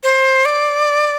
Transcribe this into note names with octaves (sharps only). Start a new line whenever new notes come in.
C5
D5